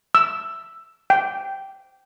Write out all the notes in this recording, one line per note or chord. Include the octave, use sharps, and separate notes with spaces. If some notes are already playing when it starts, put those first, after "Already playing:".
E6
G5